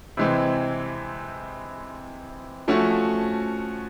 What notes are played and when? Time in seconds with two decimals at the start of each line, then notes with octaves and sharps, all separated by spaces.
0.17 C3 E3 G#3 C4
2.68 F3 A3 C#4 F#4